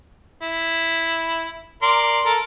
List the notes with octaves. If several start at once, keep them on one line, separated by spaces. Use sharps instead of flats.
E4
A#4 D5 C6
A4 A#4